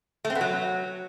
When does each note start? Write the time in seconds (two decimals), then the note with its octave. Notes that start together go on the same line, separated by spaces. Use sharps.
0.25 A3
0.30 C4
0.35 B3
0.41 F#3